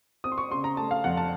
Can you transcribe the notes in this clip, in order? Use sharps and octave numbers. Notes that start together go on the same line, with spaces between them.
C4 D#6
C6
C#6
C#3 C6
A#5
A3 A5
F5
F2 F#5
A5